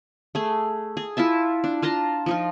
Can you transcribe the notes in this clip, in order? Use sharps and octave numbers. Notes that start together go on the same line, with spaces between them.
A3 G#4
G#4
E4 F4 E5 A5
D4
F4 A5 A#5 C6
F3 D#4 F4